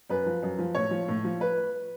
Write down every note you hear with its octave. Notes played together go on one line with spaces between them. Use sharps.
F#2 B4
F3
F#2
F3
A2 C#5
F3
A2
F3
B4